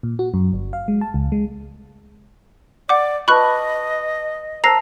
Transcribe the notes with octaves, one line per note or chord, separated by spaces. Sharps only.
A#2
F#4
F#2
G1
F5
G#3
A5
C#2
G#3
D5 F#5 D6
F4 B4 D#5 A5 B5 C#6 F#6
A#4 C5 A5 A#5 A#6 C7